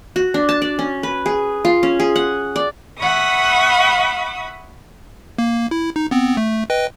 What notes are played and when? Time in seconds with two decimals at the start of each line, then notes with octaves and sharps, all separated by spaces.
0.16 F#4
0.34 D4
0.49 A5
0.62 D5
0.79 C#4
1.03 B4
1.26 G#4
1.65 F4
1.83 C#4
2.00 G#4
2.16 F#5
2.56 D5
3.00 E5 F#5 B5 C#6 D#6
5.38 A#3
5.71 E4
5.96 D#4
6.11 B3 C4
6.37 A3
6.70 B4 D#5 G5